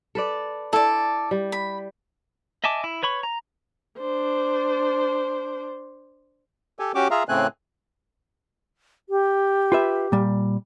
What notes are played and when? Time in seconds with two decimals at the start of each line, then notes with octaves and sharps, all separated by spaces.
0.15 A4 B4 D5
0.73 E4 A4 D5
1.31 G3
1.52 B5
2.64 D#5 E5 G#5 A5 D6
2.84 E4
3.03 B4 C#5 B5 C#6
3.23 A#5
3.99 D4 C5
6.79 G4 A4 G#5
6.95 C#4 F#4 G4 D6
7.11 F4 G#4 E5 F5 A#5
7.29 A2 C#3 A3 C4 G#5 F#6
9.09 G4
9.72 F4 B4 E5
10.12 A#2 G3